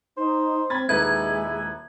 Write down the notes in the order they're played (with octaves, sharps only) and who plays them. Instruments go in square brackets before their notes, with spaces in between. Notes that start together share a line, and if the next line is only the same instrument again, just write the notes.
[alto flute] D#4 [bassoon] C5
[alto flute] C4 [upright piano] B5 G#6 A6
[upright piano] D#1 D#4 B4 [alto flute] G#3 [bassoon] E4 [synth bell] G#6